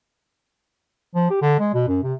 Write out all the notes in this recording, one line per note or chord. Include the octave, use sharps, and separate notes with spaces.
F3
G4
D3
G#3
B2
F#2
C3